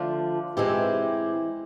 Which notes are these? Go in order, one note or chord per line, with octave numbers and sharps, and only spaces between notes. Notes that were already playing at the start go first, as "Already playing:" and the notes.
Already playing: D3 F3 A3 D4 F4
E3 G#3 C4 E4 G4